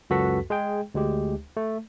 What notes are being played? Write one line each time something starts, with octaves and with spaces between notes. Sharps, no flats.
C#2 F#2 F#4 A4 B4 B6
G#3 G#4 G5
D2 G#3 G4
A3